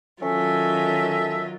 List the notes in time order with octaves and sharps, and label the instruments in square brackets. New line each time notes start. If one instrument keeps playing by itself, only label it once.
[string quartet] D#3 F#3 F4 [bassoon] C#4 [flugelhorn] A4 [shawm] E5